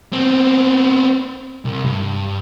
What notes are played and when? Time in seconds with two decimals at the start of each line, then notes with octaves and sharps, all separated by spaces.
0.13 B3 C4
1.65 C2
1.84 G2